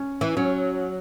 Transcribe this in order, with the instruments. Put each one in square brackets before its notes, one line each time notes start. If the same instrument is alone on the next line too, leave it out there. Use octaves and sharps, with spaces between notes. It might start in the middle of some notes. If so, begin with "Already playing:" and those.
Already playing: [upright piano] C#4
[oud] E3
[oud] F#3 [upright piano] C#4